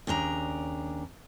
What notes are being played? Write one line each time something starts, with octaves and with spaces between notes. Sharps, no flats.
D#2 C#3 D4 A#5